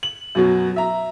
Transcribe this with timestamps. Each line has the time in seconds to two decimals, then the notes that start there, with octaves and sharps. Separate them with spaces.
0.03 F#7
0.35 F#2 B2 F#3
0.76 E5 A#5